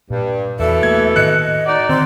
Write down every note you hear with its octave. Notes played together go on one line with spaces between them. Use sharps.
G2 A#2
E2 B2 E3 A4 E5
A3 A#3 G#6
A2 D#3 D#5 F#6 C#7
D#4 F#4 D5
D3 D#3 C4 C6